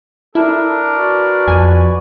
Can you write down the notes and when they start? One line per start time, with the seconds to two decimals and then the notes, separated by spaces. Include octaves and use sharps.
0.35 D4 E4 A4 A#4
0.96 F#4 B4 D5
1.48 F2 G#5